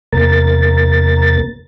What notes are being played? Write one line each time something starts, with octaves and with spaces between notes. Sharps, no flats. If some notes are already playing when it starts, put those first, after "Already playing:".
E2 C3 A#3 A#4 A6